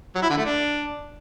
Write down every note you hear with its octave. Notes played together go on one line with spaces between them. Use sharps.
F#3
E4
D3
A3
D4